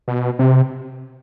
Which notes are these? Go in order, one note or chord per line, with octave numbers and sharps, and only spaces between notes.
B2
C3